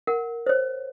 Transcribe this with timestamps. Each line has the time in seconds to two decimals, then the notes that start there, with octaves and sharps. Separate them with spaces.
0.07 A#4 F#5
0.46 C5 C#5